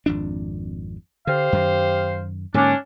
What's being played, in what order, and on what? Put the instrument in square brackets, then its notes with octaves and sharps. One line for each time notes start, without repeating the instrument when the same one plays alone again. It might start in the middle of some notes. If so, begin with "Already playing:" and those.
[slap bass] G#1 F2 D4
[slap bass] D3 [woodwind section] G4 C5 F5
[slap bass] F#2 D#3
[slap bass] G#2 D3 A#3 [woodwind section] C#4 D4